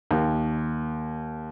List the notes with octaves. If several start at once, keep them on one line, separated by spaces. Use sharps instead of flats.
D#2